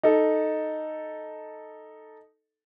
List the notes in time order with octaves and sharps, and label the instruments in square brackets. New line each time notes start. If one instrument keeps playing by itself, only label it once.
[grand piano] D#4 A4